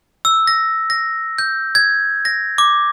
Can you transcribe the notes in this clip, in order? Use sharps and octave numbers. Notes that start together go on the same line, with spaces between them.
E6
A#6
A#6
G6
G#6
A#6
D6